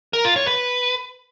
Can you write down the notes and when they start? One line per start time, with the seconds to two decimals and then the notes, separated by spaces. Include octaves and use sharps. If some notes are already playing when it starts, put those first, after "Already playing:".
0.13 A#4
0.25 F4
0.36 C#5
0.47 B4